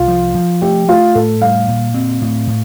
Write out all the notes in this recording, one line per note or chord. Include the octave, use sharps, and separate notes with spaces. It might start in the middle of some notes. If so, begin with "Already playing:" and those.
Already playing: C2 F4
F3
F3
A3 G4
A3 F4
A2 A4
G3 F5
A#2
C4
A2
A2